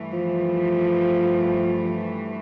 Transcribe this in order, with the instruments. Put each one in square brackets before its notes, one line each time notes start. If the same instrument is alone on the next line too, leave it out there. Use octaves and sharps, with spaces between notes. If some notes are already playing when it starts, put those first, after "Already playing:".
Already playing: [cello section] G2 E3 A3
[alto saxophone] F3